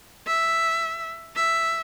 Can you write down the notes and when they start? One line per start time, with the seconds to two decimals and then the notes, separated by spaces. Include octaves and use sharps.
0.27 E5
1.36 E5